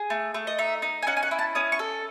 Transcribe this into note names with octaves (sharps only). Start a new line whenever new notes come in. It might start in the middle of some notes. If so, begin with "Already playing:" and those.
Already playing: G#4
A3
A3
D#5
D#4 E5
D#4
G#5
C#4 F#5
G#5
F#5
E4
A5
C#4 D#6
C#6
A4